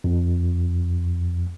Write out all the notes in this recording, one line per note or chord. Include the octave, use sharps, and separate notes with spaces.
F2